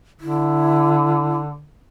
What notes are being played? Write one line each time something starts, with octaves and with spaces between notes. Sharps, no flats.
D3 E4